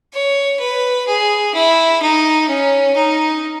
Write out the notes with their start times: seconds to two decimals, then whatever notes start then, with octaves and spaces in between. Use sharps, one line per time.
0.13 C#5
0.59 B4
1.07 G#4
1.54 E4
2.02 D#4
2.48 C#4
2.96 D#4